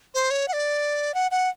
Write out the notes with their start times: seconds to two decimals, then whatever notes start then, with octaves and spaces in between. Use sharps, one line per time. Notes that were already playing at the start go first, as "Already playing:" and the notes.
0.14 C5
0.31 C#5
0.48 F#5
0.53 D5
1.14 F#5
1.31 F#5